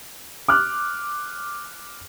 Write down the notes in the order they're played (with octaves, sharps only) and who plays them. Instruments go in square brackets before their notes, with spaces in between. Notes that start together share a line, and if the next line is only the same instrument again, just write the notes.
[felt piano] D6 F6 F#6